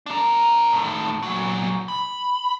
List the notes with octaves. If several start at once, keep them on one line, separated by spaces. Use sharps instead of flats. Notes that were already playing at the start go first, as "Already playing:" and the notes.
D4 A#4
A2 D#3
A#2 F#3
B5